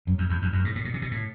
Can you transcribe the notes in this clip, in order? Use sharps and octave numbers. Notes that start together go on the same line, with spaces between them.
F#2
F2
E2
F2
F#2
G#2
A2
A#2
C3
B2
A2